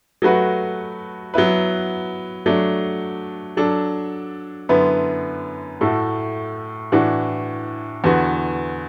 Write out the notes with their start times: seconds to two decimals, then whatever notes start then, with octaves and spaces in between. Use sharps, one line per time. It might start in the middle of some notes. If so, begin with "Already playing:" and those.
0.22 F#3 A3 F#4 B4
1.34 F#3 B3 E4 B4
2.46 F#3 A3 D4
3.57 F#3 D4 A4
4.69 F#2 D3 B3 E4 B4
5.81 A2 A3 F#4 A4
6.92 A2 E3 D4 F#4
8.04 E2 D3 B3 F#4